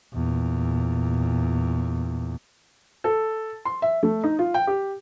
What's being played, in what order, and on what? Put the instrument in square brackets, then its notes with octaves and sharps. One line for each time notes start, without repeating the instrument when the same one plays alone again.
[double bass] E2 A#2
[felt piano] A4
C6
E5
A3
D#4
F4
G5
G4